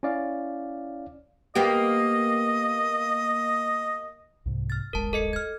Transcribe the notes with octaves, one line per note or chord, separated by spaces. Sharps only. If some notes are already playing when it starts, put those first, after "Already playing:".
C#4 E4 D5 F5
A#3 B3 G4 D#5
C2 G#2 C3
F6 A6
D1 G1 G#3 A#4 A5
A4 D#5 C#7
F6 G#6